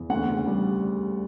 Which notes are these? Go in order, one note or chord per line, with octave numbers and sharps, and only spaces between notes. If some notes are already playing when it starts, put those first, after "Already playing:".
Already playing: E2
D2 F#5
C#3
G3